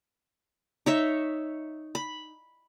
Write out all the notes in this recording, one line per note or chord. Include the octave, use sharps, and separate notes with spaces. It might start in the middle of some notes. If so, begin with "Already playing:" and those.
D#4 C#5 E5
B5